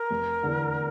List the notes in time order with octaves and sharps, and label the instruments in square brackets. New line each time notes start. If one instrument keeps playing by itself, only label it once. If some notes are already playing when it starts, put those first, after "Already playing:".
Already playing: [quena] A#4
[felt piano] F1
E2 D3